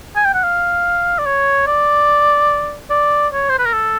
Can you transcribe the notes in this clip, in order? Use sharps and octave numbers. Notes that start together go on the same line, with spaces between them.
G#5
G5
F#5
F5
D5
C#5
D5
D5
C#5
C5
B4
A#4
A4